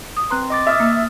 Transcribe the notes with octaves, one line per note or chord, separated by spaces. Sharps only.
D#6
C4 B4 A#5 C6 F#6
D#5 D6 A6
E5 D#6 F6 A6
A#3